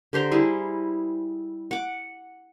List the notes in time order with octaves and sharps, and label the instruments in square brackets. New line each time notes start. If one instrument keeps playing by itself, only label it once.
[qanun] D3 G4 C5 A#5
G3 E4 G#4
F#5 D6